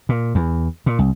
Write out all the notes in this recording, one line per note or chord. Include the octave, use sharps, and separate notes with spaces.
A#2
E2
A#2
C2